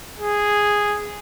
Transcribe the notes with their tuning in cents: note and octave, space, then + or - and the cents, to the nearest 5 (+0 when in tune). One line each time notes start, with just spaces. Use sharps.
G#4 -5